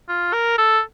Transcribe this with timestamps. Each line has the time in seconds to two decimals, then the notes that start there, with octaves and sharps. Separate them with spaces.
0.09 F4
0.33 A#4
0.58 A4